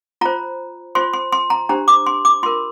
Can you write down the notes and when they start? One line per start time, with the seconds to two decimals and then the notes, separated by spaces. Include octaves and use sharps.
0.21 F4 C5 A#5
0.95 F4 C5 C6
1.13 C6
1.33 C6
1.50 A#5
1.69 D4 G4 C5 A#5
1.88 D6
2.06 C6
2.25 D6
2.43 F4 A#4 C6